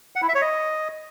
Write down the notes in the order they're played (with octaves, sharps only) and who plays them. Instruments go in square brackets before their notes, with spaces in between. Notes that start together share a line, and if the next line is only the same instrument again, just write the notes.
[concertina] F#5
E4
E5
C#5
D#5